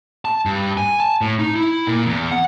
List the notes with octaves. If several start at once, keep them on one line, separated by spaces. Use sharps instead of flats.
A5
G2
G#5
A5
A2
D#4
E4
A#2
E2
F#5